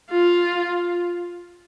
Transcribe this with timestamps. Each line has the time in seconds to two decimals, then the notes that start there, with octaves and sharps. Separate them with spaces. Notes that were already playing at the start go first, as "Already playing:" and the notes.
0.11 F4